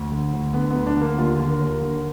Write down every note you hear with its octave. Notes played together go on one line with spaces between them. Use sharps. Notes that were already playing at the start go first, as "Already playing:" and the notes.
Already playing: D2
D3
D2
D3 B3
D2 B3
D4
D3 A#3
D#2 F4
D3
A#4
D#2
D3